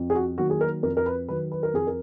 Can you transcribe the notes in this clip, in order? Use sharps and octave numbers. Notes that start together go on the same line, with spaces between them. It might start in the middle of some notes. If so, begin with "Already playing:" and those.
Already playing: F2
G#4
F#4
D#3 F#3 A#3 F#4
G#4
A#4
F2 A#4
A#4
B4
D#3 F#3 B4
B4
A#4
F2 G#4
A#4